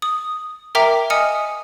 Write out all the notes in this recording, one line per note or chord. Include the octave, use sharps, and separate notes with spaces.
D#6
A#4 E5 G5 A#5 D6 B6
D#5 G#5 D#6 F6 C#7